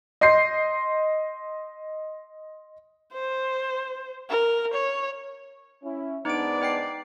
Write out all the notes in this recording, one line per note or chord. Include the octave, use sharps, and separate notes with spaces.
D#5 C6 G6 C7
C5
A#4
C#5
C#4 E4
G#2 B3 D4 D#4 D5 D7
D#4 G5 C7